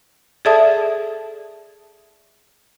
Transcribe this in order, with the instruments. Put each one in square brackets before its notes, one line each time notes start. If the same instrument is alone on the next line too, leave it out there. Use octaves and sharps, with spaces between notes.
[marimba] G#4 A4 D5 E5 A5 D#6